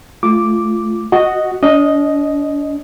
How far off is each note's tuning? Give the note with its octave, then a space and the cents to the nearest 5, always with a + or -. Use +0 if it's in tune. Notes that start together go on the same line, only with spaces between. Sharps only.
A3 -20 F4 -15 D6 -5
F#4 +0 D#5 +0 F#5 +0
D4 -40 D#5 +0